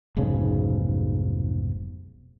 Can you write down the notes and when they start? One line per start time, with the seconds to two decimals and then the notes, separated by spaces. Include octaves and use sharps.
0.17 F1 B1 G#2 C#3